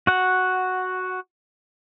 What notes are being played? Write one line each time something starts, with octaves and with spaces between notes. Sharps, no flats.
F#4 F#5